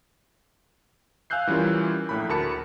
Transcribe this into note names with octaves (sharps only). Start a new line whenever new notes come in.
F5 G#5 E6 F#6 G6 C7
E3 G3 C#4 F4 A#4
A#1 A2 B5
D2 A#4 A5 B5 C#7